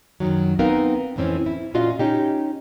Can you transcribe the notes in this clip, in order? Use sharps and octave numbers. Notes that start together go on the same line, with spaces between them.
F#2 A#2 D#3 F#3
B3 C4 D#4 A#4 B4 F5
F2 A2 E3 C4 C#4
E4
A#2 C#4 F4 F#4 D#5 F5
C#4 D#4 G4